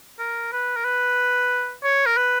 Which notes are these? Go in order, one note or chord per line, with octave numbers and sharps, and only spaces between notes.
A#4
B4
A#4
B4
C#5
A#4
B4